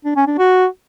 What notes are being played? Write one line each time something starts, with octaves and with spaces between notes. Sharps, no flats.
D4
C#4
D4
F#4